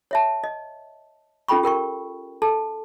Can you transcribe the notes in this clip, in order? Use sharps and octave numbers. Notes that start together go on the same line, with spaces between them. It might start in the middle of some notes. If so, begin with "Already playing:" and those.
C#5 E5 A5
D#5
C#4 F4 A4 G5 B5 C#6
G4 A#4 G5 C#6
A4 A5